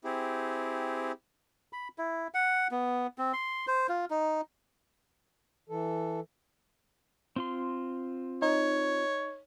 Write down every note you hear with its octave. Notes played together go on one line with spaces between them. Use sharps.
C4 E4 G4 G#4
B5
E4
F#5
B3
C4
C6
C5
F4
D#4
E3 A4
C4 F4 C6
D#4 C#5